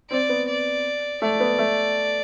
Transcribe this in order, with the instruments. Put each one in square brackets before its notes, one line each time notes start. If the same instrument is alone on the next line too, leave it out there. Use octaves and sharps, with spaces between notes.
[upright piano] C4 [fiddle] D5
[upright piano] B3
[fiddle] D5
[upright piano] A3 [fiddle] D5
[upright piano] B3
A3